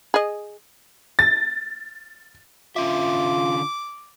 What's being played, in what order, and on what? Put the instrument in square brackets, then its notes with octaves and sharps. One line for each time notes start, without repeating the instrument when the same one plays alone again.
[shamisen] G#4 D#5
[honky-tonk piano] A6
[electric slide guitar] D3 C#4 E5 [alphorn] F4 [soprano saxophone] D6